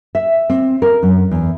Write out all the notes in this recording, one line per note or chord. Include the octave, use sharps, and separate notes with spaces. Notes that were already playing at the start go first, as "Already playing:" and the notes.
E5
C4
A#4
F#2
E2